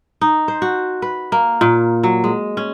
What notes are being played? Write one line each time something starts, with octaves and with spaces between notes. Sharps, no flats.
D#4
C5
F#4
B4
A#3
A#2
F#3
G#3
C#4